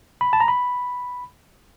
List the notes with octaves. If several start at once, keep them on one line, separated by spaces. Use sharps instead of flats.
B5
A5
A#5
B5